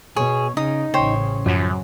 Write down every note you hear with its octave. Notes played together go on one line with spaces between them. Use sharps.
B2 G#4 C#5
C#3 D#4 D#6
A1 C#3 C5 C#5 G5
F#2 F3 F#3